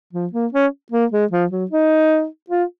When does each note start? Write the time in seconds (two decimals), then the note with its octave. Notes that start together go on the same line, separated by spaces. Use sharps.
0.13 F3
0.33 A#3
0.53 C#4
0.92 A#3
1.12 G#3
1.31 F3
1.51 F#3
1.71 D#4
2.50 F4